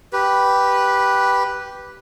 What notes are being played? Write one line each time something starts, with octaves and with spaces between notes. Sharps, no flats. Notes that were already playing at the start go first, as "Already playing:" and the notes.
G4 B4